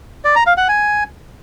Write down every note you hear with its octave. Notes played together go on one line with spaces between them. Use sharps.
D5
A#5
F5
F#5
G#5